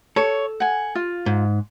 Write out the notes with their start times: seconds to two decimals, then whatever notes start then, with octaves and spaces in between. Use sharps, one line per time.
0.16 A4 C#5
0.60 F#5 G#5
0.95 F4
1.26 G#2